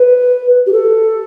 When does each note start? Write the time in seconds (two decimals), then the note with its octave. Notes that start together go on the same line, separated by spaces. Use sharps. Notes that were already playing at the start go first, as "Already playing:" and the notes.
Already playing: B4
0.66 G4
0.72 A4